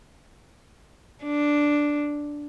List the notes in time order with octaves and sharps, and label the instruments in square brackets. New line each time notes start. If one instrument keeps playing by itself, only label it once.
[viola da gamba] D4